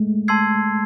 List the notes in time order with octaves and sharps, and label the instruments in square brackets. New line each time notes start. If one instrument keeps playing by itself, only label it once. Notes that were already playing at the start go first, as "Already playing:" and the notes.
Already playing: [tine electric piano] G#3 A3
[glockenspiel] A5 C6 E6 G#6 C7